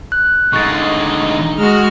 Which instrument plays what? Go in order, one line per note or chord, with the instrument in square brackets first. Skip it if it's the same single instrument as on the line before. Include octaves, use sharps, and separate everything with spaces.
[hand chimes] F#6
[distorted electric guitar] D3 G#3 [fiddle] D#4 [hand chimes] C#6 A6
[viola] G#3 [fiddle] F#4 F6